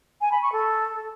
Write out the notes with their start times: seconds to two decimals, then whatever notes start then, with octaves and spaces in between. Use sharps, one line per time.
0.21 G#5
0.31 B5
0.42 C#6
0.52 A4